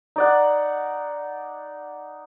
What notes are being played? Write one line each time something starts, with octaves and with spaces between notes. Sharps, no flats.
D#4 D5 F#5